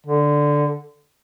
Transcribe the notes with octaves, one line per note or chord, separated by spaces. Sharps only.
D3